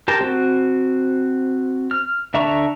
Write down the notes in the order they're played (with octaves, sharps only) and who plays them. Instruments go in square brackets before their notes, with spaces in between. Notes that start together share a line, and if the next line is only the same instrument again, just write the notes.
[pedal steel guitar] G4 A#4 A5 C6
C4 F#4
F6
D3 E5 A5 A#5 C#6